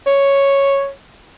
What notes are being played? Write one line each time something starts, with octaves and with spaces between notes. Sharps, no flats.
C#5